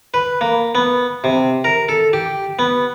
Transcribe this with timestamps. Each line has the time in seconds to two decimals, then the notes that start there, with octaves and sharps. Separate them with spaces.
0.14 B4
0.41 A#3
0.75 B3
1.24 C3
1.64 A#4
1.89 A4
2.13 G4
2.59 B3